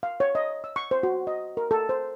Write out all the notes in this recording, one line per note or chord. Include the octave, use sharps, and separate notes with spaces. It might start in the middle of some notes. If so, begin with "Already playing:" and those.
F5
C#5
D#5
E6
C#6
C5
F#4
D#5
A#4
A4
C5